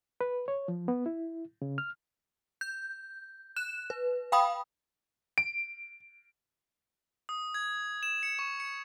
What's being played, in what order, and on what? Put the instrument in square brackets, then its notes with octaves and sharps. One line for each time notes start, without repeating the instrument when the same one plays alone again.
[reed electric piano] B4
C#5
F3
B3
E4
C#3
F6
[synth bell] G6
F#6 E7
B4
F5 G5 B5 D#6
[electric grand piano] D7
[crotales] D#6
G#6
E7
C#7
C#6
C#7